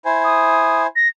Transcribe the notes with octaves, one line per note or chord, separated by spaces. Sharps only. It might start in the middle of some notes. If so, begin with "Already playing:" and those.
E4 C5 G#5
D#6
A#6